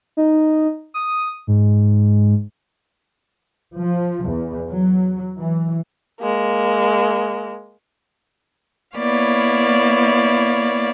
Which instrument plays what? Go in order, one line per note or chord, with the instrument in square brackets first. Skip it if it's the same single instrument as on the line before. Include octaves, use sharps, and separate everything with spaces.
[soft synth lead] D#4
D#6
G#2
[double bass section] F3
E2
F#3
E3
[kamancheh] G#3 A#3
[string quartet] A#3 B3 E4 C#5 D5 F5